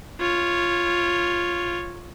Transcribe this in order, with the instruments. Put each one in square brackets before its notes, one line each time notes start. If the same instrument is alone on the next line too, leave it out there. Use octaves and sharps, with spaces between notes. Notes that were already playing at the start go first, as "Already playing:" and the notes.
[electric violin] F4 C#5